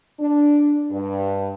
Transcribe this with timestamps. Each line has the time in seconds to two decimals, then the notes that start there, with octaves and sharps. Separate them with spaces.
0.20 D4
0.91 G2